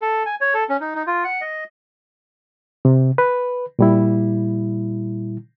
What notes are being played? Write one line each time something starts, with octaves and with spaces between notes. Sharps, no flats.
A4
G#5
C#5
A4
C#4
D#4
D#4
F4
F#5
D#5
C3
B4
A#2 G3 E4